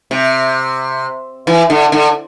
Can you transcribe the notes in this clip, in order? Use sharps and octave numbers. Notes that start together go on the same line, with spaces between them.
C3
E3
D3
D3